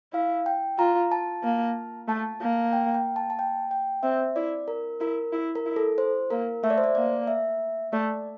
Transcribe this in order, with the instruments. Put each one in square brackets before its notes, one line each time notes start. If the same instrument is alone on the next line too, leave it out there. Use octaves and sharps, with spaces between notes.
[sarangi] E4 [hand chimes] F5
[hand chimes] G5
[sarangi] F4 [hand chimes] A#5
[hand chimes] A5
[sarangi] A#3
[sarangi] A3 [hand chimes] A5
[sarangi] A#3
[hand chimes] G5
G5
A5
A5
G5
G5
[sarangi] C4 [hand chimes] E5
[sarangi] E4 [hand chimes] D5
[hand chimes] A#4
[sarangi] E4 [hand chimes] A#4
[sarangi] E4
[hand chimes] A#4
[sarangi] E4
[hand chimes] A4
C5
[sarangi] A#3 [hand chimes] A#4
[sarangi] A3 [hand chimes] E5
[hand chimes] D5
C5
D5
[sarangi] A#3 [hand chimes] D5
[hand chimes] E5
[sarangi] A3 [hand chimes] D5